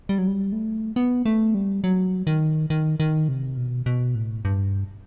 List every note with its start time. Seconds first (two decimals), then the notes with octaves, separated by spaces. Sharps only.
0.09 G3
0.18 F#3
0.27 G3
0.52 A3
0.96 B3
1.26 A3
1.54 G3
1.84 F#3
2.27 D#3
2.70 D#3
3.00 D#3
3.28 C3
3.57 B2
3.86 B2
4.15 A2
4.45 G2